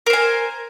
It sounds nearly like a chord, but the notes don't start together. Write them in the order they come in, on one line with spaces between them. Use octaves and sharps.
A#4 C5 G#5